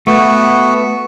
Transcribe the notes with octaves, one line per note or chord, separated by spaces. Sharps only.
A3 B3 F#4